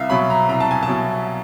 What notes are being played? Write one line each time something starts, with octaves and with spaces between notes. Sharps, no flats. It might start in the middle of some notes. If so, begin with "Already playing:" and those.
Already playing: C2 E5 F5
B2 F#3 B5
A#5
C2 A#5
A5
G#5
A5
B2 F#3